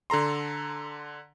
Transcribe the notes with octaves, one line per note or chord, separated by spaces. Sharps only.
D3 A4 A#5 C6